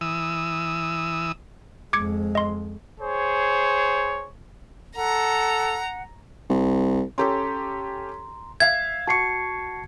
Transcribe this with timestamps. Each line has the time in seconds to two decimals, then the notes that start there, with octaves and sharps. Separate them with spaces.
0.01 E3 D#6 E6
1.93 F2 G#3 D6 G#6 C#7
2.35 D#5 C6
3.00 G#4 C5 C#5
4.96 A4 F#5 A#5
6.50 C2
7.18 C#4 G4 A4 A#5 C6
8.60 E5 F5 G#6
9.07 F#4 A5 C#6 C7 C#7